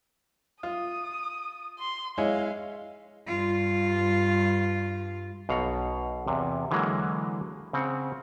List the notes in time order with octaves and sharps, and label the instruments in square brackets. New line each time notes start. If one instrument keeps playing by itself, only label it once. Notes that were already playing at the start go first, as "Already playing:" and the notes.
[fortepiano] F4 [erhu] D#6
[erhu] C6
[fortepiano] G#3 E4 C#5 [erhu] F5
[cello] G2 F4
[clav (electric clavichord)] B1 B2 F5 F#5 A#5
E2 C3
D3 E3 F#3 G#3 A#3
C#3 C4 F#5